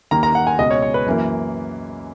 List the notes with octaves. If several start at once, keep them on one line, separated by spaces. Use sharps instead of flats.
D#2 D#3 A#3 A#5
A#5
F#5
G#5
C#2 B2 G#3 D#5
C#5
C#5
B4
F#2 E3 A#3